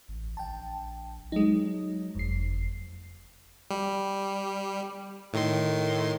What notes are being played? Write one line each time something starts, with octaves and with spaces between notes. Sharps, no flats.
A1
A#1 G5 A5
F#3 G#3 D#4
F#1 F2 C7
G3
A2 D#3 C6